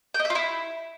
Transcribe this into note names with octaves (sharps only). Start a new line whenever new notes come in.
G5
D#5
E5
F4
E4